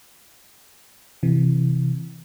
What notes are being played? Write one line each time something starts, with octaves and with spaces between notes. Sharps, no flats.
C3 E3